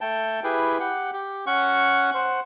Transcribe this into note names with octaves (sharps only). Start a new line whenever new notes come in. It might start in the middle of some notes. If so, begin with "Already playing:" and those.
A3 G5 A5
E4 G4 G#4 B4
G4 F#5
G4
C#4 F#5 C#6
C5 F#5